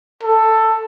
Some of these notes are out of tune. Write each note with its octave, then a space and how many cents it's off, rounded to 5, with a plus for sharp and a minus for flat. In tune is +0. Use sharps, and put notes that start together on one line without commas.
A4 +10